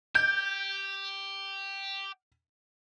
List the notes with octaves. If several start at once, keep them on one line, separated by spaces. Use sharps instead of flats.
G4 G6